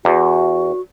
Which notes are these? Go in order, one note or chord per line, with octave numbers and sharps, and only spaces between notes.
E2 F#4